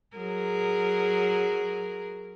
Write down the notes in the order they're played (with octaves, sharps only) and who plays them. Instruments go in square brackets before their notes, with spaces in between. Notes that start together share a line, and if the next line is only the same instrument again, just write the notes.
[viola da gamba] F#3 G#4 A#4